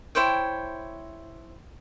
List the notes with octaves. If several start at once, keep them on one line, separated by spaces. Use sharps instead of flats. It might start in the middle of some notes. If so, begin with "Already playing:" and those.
E4 C5 C#5 G5